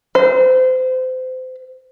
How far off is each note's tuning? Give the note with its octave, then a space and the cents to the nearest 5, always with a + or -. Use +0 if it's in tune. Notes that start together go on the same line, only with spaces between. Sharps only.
C5 -30